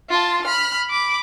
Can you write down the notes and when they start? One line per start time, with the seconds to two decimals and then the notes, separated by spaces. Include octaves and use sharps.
0.10 F4 A5
0.45 B5 F6
0.90 B5 D6